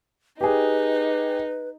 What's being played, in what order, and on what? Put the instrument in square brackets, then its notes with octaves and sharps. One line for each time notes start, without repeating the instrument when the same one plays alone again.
[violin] D#4 [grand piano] G4 G#4 [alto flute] B4